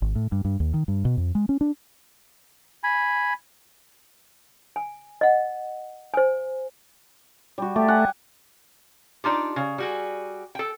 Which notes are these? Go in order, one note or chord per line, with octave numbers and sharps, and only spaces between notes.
G#1
A2
G2
G2
D#2
D#3
G2
B2
F2
G#3
C#4
D4
G#5 B5
G#5
D#5 F#5
C5 G#5
G3 F#4
A3 G4
F#5 G#5
D4 D#4 F4 G4
C#3
G3 F#4 G#4
A4 G5